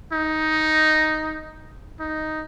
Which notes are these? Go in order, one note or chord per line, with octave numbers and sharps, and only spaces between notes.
D#4
D#4